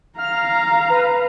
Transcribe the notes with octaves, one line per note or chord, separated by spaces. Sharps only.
F5 A#5 F6
B4